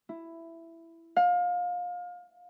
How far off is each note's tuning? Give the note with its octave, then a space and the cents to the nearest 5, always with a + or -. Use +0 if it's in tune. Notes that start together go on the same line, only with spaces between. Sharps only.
E4 +10
F5 +30